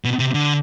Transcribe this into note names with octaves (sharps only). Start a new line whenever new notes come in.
B2
C3
D3